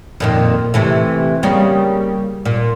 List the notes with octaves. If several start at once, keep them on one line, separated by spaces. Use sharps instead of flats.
F2 A#2 D#3
C3 E3 A3
C#3 G3 A#3
A#2